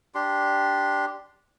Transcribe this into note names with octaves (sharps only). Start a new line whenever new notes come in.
D4 G4 C6